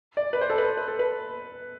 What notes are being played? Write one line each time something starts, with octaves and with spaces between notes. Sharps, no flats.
D5
B4
C5
A4
B4
B4
A4
B4